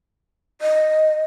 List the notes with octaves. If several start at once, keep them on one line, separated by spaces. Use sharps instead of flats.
D#5